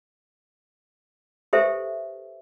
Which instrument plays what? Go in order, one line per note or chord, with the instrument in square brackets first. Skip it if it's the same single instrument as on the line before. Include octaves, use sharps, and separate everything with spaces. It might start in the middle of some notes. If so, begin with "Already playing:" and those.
[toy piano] G4 A4 B4 C5 E5